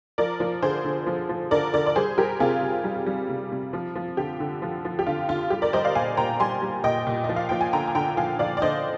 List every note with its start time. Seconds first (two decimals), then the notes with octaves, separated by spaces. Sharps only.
0.18 F3 A#4 D5
0.40 F3
0.62 D3 G#4 C5
0.85 D3
1.06 F3
1.29 F3
1.51 D3 A#4 D5
1.74 D3 A#4 D5
1.86 D5
1.96 G3 G#4 C5
2.18 G3 G4 A#4
2.40 C3 F4 G#4
2.62 C3
2.84 G3
3.07 G3
3.29 C3
3.52 C3
3.73 F3
3.95 F3
4.17 D3 G4
4.40 D3
4.62 F3
4.85 F3
4.99 G4
5.06 D3 F4
5.28 D3 F4
5.50 G3 G4
5.62 A#4 D5
5.73 G3 C5 D#5
5.84 D5 F5
5.95 A#2 F5 G#5
6.17 A#2 G5 A#5
6.40 G3 G#5 C6
6.62 G3
6.84 A#2 D#5 G5
7.07 A#2
7.24 F3 D#5
7.36 F5
7.49 F3 G5
7.61 G#5
7.73 D3 G5 A#5
7.88 G#5
7.95 D3 G5 A#5
8.17 F3 F5 G#5
8.39 F3 D5 F5
8.57 D5
8.62 D3 C5 D#5